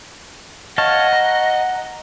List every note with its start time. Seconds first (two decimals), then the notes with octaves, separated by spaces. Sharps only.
0.78 C#5 D#5 F5 F#5 A5
1.13 A#5